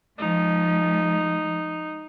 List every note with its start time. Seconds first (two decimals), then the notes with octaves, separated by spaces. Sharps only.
0.18 F3 G#3 D#4